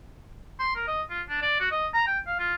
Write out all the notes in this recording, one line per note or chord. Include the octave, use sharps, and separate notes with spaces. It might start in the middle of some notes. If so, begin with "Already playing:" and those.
C6
A#4
D#5
F4
D4
D5
F#4
D#5
A#5
G5
F5
F4